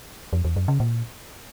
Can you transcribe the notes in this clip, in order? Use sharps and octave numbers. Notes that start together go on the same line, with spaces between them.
F2
E2
F#2
C#3
A#2